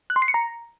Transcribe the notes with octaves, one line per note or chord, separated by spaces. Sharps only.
F#6
C6
C7
C#7
A#5